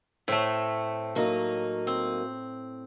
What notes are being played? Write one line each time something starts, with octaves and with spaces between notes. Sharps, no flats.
A2 A3 C4
F#3 A#3 D#4
C4